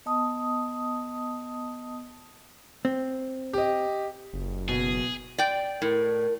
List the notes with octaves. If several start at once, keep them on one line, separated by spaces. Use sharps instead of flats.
B3 D#5 A5 D#6
C4
G4 D#5
F#1
B2 G#4
D5 G5
A2 A#4